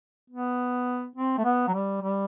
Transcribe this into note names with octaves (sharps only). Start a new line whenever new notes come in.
B3
C4
A3
B3
F#3
G3
G3